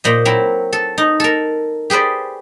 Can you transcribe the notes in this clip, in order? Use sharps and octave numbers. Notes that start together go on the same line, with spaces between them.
A#2 C5 D#5
F#3 C4 E4 A#4
A4
D#4
A4 A#4
G4 G#4 B4 C5 D5